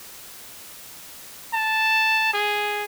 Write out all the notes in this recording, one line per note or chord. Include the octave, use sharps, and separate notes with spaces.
A5
G#4